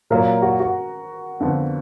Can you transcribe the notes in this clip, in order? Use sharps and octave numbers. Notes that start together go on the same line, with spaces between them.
A#2 F#3 A#3 F4 A#4
F#4
F#4
F2 D3 F3 B3